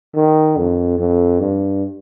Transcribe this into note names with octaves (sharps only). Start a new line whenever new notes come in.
D#3
F2
F2
G2